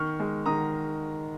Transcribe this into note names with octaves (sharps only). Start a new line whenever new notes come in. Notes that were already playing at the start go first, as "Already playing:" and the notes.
Already playing: D#3 C#6 F6
G#3
D#3 A#5 D#6